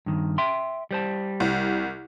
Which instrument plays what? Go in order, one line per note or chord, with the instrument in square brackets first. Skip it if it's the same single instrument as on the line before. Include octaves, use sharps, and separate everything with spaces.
[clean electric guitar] G2 D#3
E5 G5 C6
G3 C5 A5
[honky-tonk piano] C2